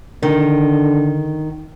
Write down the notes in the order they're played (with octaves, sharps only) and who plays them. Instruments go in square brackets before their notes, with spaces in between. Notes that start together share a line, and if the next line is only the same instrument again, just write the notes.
[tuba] D3 [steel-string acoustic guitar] D#3